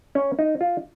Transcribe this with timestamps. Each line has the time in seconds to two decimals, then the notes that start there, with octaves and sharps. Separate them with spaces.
0.15 C#4
0.39 D#4
0.61 F4